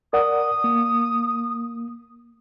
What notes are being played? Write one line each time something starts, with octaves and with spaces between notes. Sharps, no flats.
A#4 D5 F#5 D#6
A#3